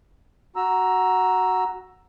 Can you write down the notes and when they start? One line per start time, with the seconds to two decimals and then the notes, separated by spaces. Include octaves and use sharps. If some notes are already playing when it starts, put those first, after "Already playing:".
0.56 F#4 A#5 E6